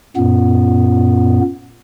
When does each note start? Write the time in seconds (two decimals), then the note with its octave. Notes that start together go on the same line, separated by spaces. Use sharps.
0.17 F#2 A#2 B3